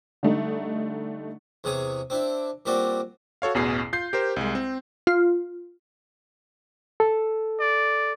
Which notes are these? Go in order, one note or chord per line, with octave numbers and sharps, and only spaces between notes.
D3 G3 A3 D#4
E2 C3 G#4 C#5
C4 D4 E4
A#2 G3 C4 F#4 D5
F#4 A4 C#5 F5
A1 E2 B2 G#4 C7
F4 G6 C7
G4 A#4 C5
C2 G#3
C4
F4
A4
D5